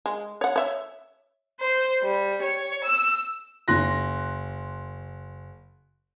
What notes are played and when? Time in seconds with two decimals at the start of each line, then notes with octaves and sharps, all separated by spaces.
0.06 G#3
0.41 C#5 F#5
0.56 C#5 E5
1.59 C5
2.02 G3
2.41 C#5
2.84 E6
3.68 F#1 C6 F#6 A#6